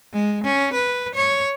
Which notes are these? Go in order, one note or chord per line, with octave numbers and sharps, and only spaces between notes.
G#3
C#4
B4
C#5